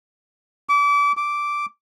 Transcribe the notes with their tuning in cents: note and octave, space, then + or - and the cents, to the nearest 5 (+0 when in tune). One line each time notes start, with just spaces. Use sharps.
D6 -30
D6 -5